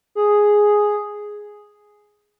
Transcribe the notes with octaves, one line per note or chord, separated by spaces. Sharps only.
G#4